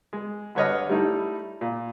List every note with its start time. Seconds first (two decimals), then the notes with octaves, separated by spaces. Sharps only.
0.13 G#3
0.55 G2 D3 B4 C#5 D#5 F6
0.89 G3 A3 D#4 E4
1.61 A#2